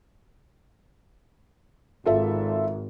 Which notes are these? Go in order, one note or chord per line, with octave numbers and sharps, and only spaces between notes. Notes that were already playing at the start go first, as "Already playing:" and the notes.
G#1 F4 A4 E5